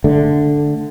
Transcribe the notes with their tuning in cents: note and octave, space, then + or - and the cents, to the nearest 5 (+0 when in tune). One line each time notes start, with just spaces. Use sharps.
D3 +0 A3 +0